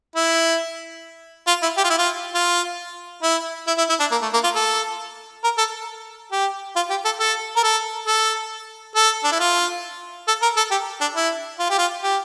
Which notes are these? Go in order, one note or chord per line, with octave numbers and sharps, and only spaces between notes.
E4
F4
E4
G4
F4
E4
F4
F4
E4
E4
E4
E4
D4
A#3
A3
A#3
F4
A4
A#4
A4
G4
F4
G4
A4
A4
A#4
A4
A4
A4
D4
E4
F4
A4
A#4
A4
G4
D4
E4
F4
G4
F4
G4